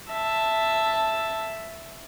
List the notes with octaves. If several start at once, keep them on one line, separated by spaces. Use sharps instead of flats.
E5 A5